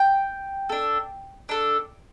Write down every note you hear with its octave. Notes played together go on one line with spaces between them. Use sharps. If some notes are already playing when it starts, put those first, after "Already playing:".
Already playing: G5
D4 A4
D4 A4